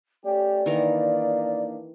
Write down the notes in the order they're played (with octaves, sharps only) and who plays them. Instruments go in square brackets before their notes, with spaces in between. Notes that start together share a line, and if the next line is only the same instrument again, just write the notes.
[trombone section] A3 C#4 G4 [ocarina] D5
[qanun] D#3 E3 A#5 [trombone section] A#3 D4 D#4